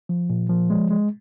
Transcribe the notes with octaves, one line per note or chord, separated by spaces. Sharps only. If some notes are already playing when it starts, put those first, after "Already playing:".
F3
A#2
F3
G#3
G#3